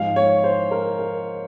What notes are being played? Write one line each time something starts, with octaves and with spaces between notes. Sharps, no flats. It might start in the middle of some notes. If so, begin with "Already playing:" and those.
Already playing: G#2 F3 F5
C#5
C5
A#4
A#4